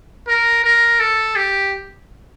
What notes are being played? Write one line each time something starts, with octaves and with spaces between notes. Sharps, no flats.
A#4
A#4
A4
G4